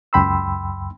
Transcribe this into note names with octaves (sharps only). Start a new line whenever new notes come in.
C#2 F#2 G5 B5 C6 E6